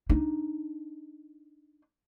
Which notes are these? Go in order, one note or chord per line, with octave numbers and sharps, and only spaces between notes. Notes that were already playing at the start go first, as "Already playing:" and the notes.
D4 D#4